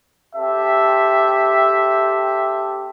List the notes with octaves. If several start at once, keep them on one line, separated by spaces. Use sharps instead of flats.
C4 G4 A4 E5